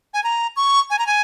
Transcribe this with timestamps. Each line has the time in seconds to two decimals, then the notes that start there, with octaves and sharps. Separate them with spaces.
0.14 G#5
0.24 A#5
0.56 C#6
0.90 G#5
0.99 A#5
1.07 G#5